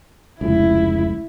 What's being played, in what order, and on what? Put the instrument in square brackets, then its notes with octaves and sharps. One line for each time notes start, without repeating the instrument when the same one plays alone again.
[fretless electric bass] F1 C#2 [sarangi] E4